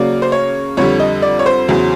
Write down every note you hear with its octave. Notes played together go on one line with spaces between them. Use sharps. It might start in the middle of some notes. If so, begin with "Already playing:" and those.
Already playing: C#3 F#3 A#3 D5
C5
C#5
F2 D3 G3 C#5
D#5
D5
C#5
C5
E2 C#3 F#3